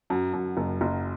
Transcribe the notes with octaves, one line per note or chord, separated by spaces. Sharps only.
F#2
F#2
F#1
F#1